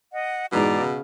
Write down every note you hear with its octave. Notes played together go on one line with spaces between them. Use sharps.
D#5 F#5
G#2 B2 E3 G#3 D5 A#5 D6
C#3